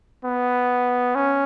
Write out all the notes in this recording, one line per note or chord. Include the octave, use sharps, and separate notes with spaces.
B3
C#4